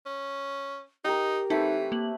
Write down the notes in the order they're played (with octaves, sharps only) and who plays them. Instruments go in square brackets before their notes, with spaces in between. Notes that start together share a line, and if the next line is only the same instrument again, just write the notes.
[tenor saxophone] C#4
[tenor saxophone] D#4 [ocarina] G4 [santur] A#4 G5
[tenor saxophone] E3 [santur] A3 C4 B4 [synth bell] D#4
[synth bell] A#3 F#7